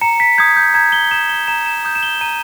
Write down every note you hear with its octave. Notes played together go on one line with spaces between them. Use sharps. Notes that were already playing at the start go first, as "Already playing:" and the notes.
A#5 C#7
B6
D#6 G6 G#6
G6
A#5 G#6
G7
D#6 G6 E7
G7
A#5 E7
E7
D#6 G6
E7
G7
A#5 D#7